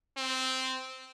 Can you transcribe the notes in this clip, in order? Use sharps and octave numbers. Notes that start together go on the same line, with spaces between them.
C4